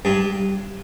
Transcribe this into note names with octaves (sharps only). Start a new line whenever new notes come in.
G2